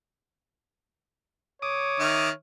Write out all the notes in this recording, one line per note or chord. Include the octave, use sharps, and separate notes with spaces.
C#5 D6 D#6
D#3 E5 F6